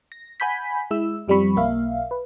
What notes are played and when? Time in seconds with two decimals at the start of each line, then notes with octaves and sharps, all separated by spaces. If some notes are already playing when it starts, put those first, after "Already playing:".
0.12 A#6
0.40 F#5 G#5 B5 G6 B6
0.91 G#3 E4 E6
1.28 F#2 F3 G3 C4 B5 C#6
1.56 B1 A#3 E5 F5
2.11 B4